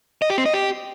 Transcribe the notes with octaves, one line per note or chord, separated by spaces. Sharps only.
D#5
G4
C4
D#5
G4